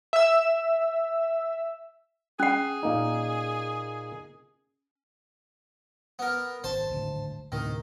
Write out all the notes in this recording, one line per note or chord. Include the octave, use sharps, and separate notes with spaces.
E5 E6
C#4 G#4 F#5
A#2 A#3 D#4
B3 A#4
G#1 C5 A5
D1 G#1 D2
D2 A2 C3 D#3